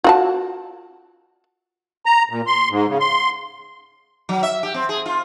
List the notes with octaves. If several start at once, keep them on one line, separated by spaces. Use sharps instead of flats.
F4 F#4 A5
A#5
A#2
C6
G#2
C#3
C6
F#3
E5
G4
C4
G#4
F4